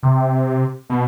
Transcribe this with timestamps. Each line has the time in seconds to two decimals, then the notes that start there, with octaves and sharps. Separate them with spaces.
0.03 C3
0.90 B2